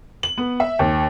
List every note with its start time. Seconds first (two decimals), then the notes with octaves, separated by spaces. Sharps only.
0.23 F#7
0.38 B3
0.60 E5
0.79 D#2